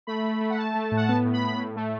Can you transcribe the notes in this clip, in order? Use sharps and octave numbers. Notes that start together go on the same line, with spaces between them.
A3 B5
A3
A3
F#5
A3 A5
A3
A2
F#5
B3 A5
A2
B5
A2
A2
A3